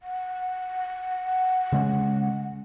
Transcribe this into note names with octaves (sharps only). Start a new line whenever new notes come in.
F#5
C#3 G#3 C#4